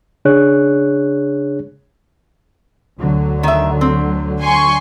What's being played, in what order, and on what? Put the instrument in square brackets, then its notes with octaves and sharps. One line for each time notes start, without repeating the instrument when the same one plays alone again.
[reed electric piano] C#3 D4 G#4 C#5 F#6
[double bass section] D2 D3 F#3
[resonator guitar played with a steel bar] D#3 E5
C4
[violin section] G#5 C6 C#6